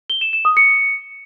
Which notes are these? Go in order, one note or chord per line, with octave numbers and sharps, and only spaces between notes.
G7
E7
E7
D#6
C#7